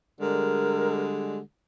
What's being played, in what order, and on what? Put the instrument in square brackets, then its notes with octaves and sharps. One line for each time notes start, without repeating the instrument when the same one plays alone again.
[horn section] D3 G3 G#3 [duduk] A#4